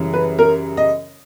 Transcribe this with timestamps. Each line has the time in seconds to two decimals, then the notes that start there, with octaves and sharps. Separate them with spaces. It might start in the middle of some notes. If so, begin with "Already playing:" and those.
Already playing: F#2 C#3 E3 G3
0.13 B4
0.39 A#4
0.77 D#5